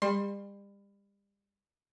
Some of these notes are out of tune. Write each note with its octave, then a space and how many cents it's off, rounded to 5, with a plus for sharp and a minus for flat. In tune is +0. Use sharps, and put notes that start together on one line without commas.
G3 +35 C6 +20